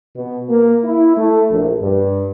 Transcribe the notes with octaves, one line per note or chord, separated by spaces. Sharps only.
B2
A#3
E4
A3
A#1
G2